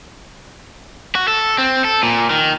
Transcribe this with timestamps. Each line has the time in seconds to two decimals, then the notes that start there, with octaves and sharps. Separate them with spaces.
1.15 F#4
1.28 A4
1.58 C4
1.85 A4
2.03 A#2
2.31 D#3